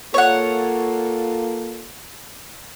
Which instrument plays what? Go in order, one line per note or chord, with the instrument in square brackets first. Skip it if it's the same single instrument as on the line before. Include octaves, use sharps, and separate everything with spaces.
[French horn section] A#3 F4 A4 [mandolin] C#5 F#5